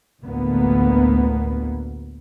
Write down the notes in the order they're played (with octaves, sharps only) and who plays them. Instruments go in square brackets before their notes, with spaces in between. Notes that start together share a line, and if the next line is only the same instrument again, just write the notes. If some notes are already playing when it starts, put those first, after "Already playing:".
[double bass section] A1 D2 D3 A#3 B3